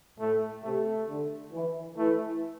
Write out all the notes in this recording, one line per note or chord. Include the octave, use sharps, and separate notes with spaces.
A2 A3
C3 A3
D3
E3
E3 A3